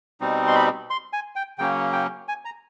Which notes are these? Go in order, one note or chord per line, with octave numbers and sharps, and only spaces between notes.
B2 G3 C4 D#4
C6
B5
C6
G#5
G5
C#3 F#3 A#3 C#4 G5
G5
G#5
A#5